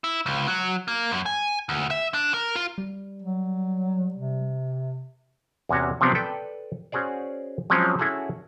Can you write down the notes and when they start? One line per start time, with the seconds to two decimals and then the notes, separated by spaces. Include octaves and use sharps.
0.04 E4
0.26 C#2
0.48 F#3
0.88 A#3
1.11 F#2
1.26 G#5
1.69 D2
1.90 E5
2.14 D4
2.34 A#4
2.56 F4
2.78 G3
3.22 F#3
4.14 C3
5.69 E2 C3 C#4 F#4 A#5
6.01 C3 F3 F#3 B3 C4 D4
6.15 A4 B4 D5 G5
6.92 C#4 F#4 G#4 C5 D5
7.70 F3 F#3 G#3 C4 C#4
7.99 C#4 E4 F#4 G#4 A4